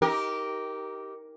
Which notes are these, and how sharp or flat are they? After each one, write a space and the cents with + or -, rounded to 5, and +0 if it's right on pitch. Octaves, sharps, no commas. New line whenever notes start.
D#4 +25 G4 -10 A#4 +0